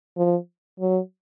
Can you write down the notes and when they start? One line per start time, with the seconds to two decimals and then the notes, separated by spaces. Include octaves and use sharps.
0.17 F3
0.80 F#3